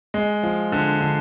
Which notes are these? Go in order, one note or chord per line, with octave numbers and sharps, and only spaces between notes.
G#3
F3
D3
D3